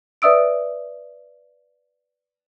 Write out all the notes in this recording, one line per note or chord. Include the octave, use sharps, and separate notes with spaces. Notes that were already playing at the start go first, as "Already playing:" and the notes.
B4 D5 E5 D#6 E6 D7